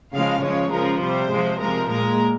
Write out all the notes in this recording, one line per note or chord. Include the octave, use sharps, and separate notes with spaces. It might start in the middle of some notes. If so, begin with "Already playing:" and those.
C#3 F3 G#3 F5
C#3 F3 G#3 C#5
C#3 F3 G#3 A#4
C3 G3 C5
C3 F3 G#3
C3 F3 G#3 A#4
A#2 G#3 A#4